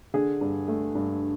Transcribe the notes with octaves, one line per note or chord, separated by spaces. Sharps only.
D3 G#4
G2
A3
G2